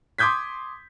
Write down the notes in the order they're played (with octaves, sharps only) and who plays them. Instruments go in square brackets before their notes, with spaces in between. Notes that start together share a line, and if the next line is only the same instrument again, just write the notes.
[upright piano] C6 D6 D#6 G6 G#6 B6